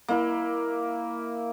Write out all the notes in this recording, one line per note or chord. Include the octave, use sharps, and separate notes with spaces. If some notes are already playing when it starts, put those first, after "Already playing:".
A#3 E4